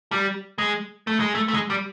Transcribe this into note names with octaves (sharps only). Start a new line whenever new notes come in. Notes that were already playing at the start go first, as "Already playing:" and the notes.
G3
G#3
A3
G#3
A3
A3
G#3
G3